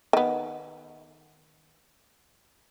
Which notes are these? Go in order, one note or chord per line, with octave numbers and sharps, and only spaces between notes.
D#3 B3